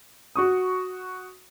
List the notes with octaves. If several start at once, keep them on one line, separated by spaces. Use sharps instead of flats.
F#4 C#6 D#6